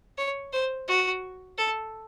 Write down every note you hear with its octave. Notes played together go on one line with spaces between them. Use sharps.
C#5
C5
F#4
A4